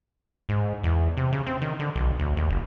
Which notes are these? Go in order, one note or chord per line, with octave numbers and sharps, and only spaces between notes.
G#2
E2
C3
C#3
C4
D#3
D3
B1
D2
D#2
F#1